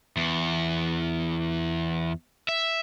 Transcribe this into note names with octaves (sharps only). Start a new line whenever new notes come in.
E2
E5